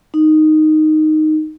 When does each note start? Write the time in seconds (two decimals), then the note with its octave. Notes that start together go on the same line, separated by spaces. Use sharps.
0.14 D#4